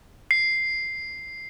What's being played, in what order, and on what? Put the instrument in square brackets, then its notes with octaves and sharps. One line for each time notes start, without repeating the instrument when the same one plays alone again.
[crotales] C7